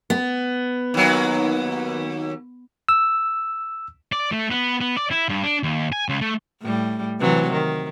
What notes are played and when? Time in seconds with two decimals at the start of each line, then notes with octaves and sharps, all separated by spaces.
0.10 B3
0.94 D#2 F#3
2.89 E6
4.12 D5
4.32 A3
4.51 B3
4.81 B3
4.97 D5
5.11 E4
5.29 G2
5.43 D4
5.63 D#2
5.92 G#5
6.09 C#2
6.21 A3
6.62 A2 G3
7.20 C3 E3 F#3
7.52 D#3